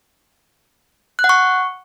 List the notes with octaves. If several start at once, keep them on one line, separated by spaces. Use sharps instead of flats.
F#6
F#5
C#6